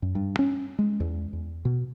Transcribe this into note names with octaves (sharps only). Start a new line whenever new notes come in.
F#2
G2
C#4
G#3
E2
E2
B2